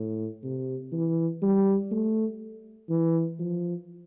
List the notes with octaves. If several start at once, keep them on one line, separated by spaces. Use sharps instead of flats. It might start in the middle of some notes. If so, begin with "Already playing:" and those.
Already playing: A2
C3
E3
G3
A3
E3
F3